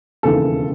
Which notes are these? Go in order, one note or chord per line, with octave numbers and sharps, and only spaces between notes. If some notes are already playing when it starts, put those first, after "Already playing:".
E1 D#2 C#3 E3 A4